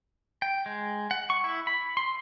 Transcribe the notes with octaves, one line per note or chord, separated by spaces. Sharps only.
G5
G#3
F#5
C#6
E4
B5
C6